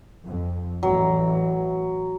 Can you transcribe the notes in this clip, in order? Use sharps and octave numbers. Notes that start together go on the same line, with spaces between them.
F2
A1 E3 F#3